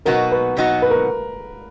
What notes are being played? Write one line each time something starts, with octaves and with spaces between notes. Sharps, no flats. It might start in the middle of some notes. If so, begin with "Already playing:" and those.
B2 F#3 B3 D#4 F#4 A#4
B4
B2 F#3 B3 D#4 F#4
B4
A#4